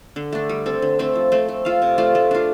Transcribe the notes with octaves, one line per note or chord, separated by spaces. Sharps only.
D3
A3 D4
G3
C4 A4
D3
A3 C4 A4
F3
A3 C4
A3
F4 A4 F5
C3
A3 F4 D5
A3
D4 F4